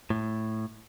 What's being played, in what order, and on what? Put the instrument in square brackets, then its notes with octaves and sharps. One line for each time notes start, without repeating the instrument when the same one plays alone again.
[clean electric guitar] A2